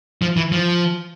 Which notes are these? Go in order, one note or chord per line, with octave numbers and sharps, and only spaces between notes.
F3
E3
F3